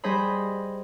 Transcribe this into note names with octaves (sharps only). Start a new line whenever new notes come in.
G3 G#4 C5 D#5 B5